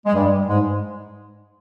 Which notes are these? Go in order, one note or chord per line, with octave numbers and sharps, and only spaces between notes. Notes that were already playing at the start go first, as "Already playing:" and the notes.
G#3
G2 G3
G#2 G#3